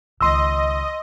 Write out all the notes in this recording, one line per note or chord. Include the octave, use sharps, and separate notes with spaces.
C#2 D#3 D#5 C6 E6